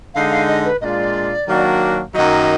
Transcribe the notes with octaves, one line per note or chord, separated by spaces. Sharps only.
D3 G#3 D#4 F5
F5
D#5
B4
A#2 G#3 D4 F4 D5 D#5
D#3 F#3 A#3 D4 F#4
F#2 D#3 F#3 A#3 D#4 D#5